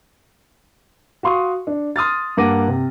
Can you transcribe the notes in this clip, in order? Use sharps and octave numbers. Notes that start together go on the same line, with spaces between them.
F#4 F5 C6 C#6 D#6
D4
C6 D#6 F6 A6
G2 A#3 F#5 D6 A#6 D#7
C3